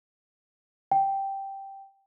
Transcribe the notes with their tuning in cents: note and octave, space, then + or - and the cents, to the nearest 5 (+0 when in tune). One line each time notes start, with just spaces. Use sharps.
G5 -5